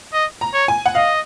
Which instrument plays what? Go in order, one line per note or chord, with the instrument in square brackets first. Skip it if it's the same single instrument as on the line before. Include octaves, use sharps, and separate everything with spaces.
[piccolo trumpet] D#5
[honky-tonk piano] A#5
[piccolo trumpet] C#5
[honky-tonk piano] G#5
F#5
[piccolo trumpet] D#5 [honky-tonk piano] F5